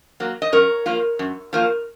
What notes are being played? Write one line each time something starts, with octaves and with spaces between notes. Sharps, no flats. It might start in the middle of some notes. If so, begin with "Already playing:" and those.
F#3 A#3
D#5
F#2 A#4 C#5
F3 A#3 F4
F#2
F3 A#3 F4